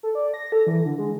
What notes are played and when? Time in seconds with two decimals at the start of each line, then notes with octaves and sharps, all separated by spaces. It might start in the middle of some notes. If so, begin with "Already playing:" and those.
0.03 A4
0.15 D5
0.34 A#6
0.52 A4
0.67 E3
0.85 D3
0.99 G#3